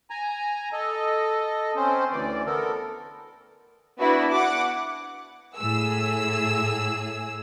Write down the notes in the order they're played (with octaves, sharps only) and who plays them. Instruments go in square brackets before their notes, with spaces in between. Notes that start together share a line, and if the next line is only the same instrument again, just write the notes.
[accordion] G#5 A#5
A4 D#5
C4 C#4 C5
D2 E3 D5
B3 A4 A#4
[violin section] B3 D4 E4 F#4 B4
F#5 D6
[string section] A2 G#4 E6